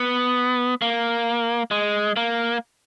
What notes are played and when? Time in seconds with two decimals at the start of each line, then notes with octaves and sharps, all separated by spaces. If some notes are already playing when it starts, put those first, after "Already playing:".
Already playing: B3
0.82 A#3
1.71 G#3
2.16 A#3